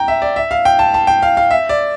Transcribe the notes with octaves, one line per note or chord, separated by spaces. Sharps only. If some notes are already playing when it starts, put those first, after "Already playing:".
Already playing: G5 A#5
E5
D5
E5
F5
G5
A5
A5
G5
F5
F5
E5
D5